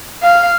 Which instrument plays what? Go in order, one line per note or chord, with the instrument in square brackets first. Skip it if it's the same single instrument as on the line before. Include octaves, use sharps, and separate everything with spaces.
[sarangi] F5